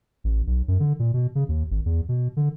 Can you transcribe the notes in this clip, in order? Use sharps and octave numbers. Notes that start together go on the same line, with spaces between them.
A1
B1
F#2
D3
A#2
B2
C#3
D#2
G#1
E2
B2
D3